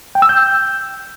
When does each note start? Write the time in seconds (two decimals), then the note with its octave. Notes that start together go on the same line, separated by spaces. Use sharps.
0.15 G5
0.22 E6
0.29 G6